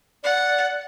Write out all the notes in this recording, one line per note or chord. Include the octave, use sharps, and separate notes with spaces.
D5 F#5